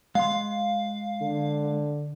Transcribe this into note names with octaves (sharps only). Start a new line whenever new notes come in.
G#3 F5 C6
D3